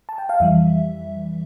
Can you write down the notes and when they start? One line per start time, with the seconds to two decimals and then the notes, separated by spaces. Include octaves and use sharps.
0.09 A5
0.18 G5
0.29 F5
0.40 F2 E3 G3 E5